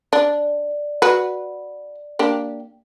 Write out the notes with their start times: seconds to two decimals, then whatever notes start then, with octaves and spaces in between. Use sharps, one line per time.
0.13 D4 D5
1.02 F#4 B4
2.19 A#3 D4 G4